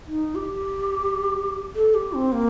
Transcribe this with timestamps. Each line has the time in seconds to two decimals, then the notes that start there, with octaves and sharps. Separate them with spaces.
0.08 D#4
0.35 G4
1.75 A4
1.94 G4
2.13 C4
2.32 A#3